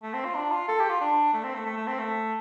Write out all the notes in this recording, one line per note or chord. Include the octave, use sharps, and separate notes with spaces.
A3
C4
F4
D4
F4
A4
G4
F4
D4
A3
C4
A3
A3
A3
C4
A3